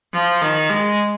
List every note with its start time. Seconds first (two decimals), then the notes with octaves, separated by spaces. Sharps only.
0.13 F3
0.42 D#3
0.70 G#3